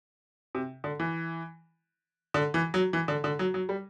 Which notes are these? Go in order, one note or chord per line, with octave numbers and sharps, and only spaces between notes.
C3
D3
E3
D3
E3
F#3
E3
D3
D3
F#3
F#3
G3